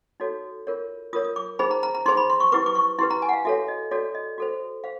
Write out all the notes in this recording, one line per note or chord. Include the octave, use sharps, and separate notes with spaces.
D#4 F#4 A4 C#5
F4 A#4 C#5
F4 A#4 C#5 D#6
D#6
D6
D#4 G#4 C5 B5
A#5
A#5
A#5
D#4 G#4 C5 C6
B5
C6
C#6
E4 G4 B4 D6
D6
C#6
E4 G4 B4 C6
A#5
G#5
F#5
F5
F#4 A4 C#5 E5
D#5
F#4 A4 C#5 D5
D#5
F#4 A4 C5
C5 F5